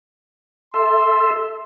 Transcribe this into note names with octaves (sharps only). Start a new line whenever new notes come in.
A4 E5 C6